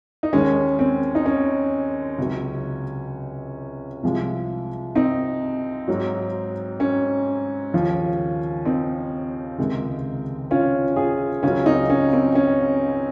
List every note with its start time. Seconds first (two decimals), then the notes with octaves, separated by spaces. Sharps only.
0.23 D#4
0.33 D#2 D#3 G#3 C#4
0.79 C4
1.15 D#4
1.26 C#4
2.18 C#2 C3 F#3
4.03 C2 C3 F3 G#3
4.96 C4 D#4
5.88 G#2 F#3
6.80 C#4
7.73 D#2 C#3 F3
8.65 C4 D#4
9.58 C#2 C3 D#3 G#3
10.51 C#4 F4
10.96 F4 G#4
11.43 C#2 C#3 F#3 C#4 F4
11.66 C4 D#4
11.90 C#4
12.13 C4
12.35 C#4